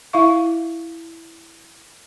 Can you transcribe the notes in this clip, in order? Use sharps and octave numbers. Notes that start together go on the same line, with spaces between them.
E4 E5 F5 C#6